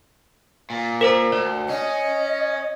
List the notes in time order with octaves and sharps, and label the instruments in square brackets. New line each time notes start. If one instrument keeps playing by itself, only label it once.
[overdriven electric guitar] A#2
[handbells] A#4 C5 A#5
[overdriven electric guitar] D2 [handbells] D5
[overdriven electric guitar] C#4 [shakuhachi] D#5